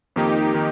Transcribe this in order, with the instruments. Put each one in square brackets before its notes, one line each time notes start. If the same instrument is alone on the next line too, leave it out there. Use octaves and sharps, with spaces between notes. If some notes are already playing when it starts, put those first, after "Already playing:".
[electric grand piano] F2 D#3 A#3 [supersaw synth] D#4 G4
[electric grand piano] D#3